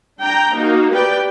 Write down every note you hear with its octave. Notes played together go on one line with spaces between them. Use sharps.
D4 G5 A#5
A#3 D#4 F#4
G4 B4 D5 G5